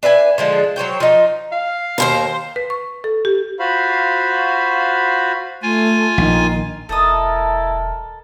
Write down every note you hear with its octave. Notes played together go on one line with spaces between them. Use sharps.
D4 B4 E5 G#5
D3 F3 G#3
F#3 C5 C#5 G5
F3 D#4
F5
D#2 G#2 A#4 C5
B4
C#6
A4
G4
F4 F#4 C5 F5 B5
A3 F4 G#5
A#1 D#3
E1 E4 A4 A#4 D#5 A5 D#6